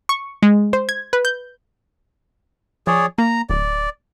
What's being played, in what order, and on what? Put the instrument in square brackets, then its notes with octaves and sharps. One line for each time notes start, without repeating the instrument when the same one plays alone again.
[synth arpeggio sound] C#6
G#3
C5
G#6
B4
G6
[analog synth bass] F3 [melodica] G#4 C#5 D5
[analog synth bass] A#3 [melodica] A#5
[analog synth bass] D1 [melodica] D5